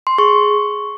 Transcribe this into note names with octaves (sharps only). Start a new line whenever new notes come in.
C6
G#4 C#6